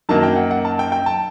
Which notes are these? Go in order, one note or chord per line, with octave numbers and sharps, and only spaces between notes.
F#2 D#3 F#3 A#3 A5
G5
F#5
F#5
A5
G5
G5
A5